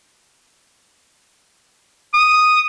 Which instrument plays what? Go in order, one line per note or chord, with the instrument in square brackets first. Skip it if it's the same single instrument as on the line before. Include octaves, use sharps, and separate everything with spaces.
[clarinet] D#6